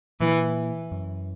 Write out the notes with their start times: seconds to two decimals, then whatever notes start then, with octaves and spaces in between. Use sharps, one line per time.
0.20 A#2 E3
0.92 F#2